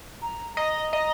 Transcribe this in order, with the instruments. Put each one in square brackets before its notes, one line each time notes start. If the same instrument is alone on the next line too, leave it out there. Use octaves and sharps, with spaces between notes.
[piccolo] A#5
[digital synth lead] D#5 [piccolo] A#5
[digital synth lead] D#5